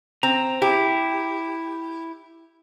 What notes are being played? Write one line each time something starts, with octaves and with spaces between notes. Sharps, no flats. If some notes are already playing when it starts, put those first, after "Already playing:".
C4 A#5
E4 G4